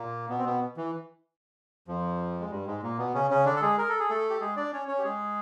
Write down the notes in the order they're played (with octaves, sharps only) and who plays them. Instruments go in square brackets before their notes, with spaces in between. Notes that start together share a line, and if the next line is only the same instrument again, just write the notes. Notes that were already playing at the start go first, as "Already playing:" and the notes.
Already playing: [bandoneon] A#2 A#3
B2 B3
C4
B2 B3
E3
F2 F3
G#3
G2 G3
G#2 G#3
A#2 A#3
B2 B3
C#3 C#4
C#3 C#4
D3 D4
A4
G#3 G#4
A#4
A4
G#4
A3 A4
G4
G#3 G#4
D4 D5
C#4 C#5
C#4 C#5
G4
G#3 G#4